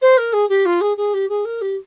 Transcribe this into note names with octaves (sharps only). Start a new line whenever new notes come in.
C5
A#4
G#4
G4
F4
G#4
G#4
G4
G#4
A#4
G4